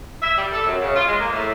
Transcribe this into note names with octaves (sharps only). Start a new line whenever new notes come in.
E5
G3
A4
F#2
C#3
F4
G#3
A#3
A2